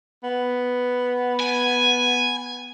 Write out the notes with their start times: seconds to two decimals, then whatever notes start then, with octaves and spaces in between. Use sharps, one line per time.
0.23 B3
1.40 G#5